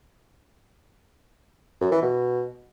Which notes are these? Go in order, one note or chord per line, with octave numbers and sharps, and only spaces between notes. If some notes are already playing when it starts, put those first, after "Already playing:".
F#2
E3
B2